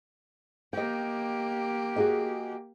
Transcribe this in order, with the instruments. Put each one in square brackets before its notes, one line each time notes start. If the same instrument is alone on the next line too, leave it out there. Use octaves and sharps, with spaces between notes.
[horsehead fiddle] A#3 G4 [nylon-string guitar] D#5 G5
[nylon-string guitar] F#4 G#4 D#5